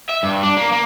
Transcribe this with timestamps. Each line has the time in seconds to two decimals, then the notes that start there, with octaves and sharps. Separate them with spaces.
0.09 E5
0.23 G2
0.43 D4
0.57 A#3
0.72 A#3